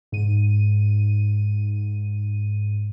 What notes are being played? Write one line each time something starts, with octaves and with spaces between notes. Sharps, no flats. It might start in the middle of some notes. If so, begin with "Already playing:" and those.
G#2 D#7